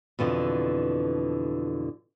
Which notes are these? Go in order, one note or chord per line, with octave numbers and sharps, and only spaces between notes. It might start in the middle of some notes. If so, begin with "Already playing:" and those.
F2 B2 D3 E3